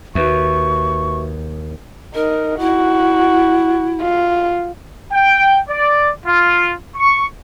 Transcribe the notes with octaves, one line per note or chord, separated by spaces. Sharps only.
D#2 F#4 B4 E5 C#6
D#4 A#4
E4 F#4
F4
G5
D5
F4
C#6